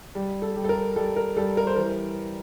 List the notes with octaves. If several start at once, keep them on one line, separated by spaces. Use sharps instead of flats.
G3
A4
G3
A4
A#4
G3 A4
A#4
G3 A4
A#4
C5
E3 A#4